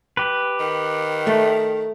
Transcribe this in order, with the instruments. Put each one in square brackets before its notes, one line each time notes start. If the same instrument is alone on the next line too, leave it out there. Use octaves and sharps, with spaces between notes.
[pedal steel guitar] G4 B4
[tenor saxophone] D#3
[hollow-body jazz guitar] A3